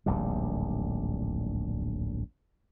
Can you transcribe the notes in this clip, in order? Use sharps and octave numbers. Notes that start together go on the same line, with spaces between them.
D1 A#1 D#2 G3